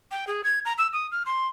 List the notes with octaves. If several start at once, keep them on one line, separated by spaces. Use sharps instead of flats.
G5
G#4
G#6
A#5
E6
D#6
F6
C6